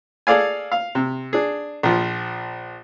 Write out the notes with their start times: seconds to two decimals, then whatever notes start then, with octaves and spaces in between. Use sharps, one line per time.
0.27 G#4 A4 D5 F5 G#5
0.72 F5
0.95 C3
1.33 D4 G#4
1.83 A#1 F3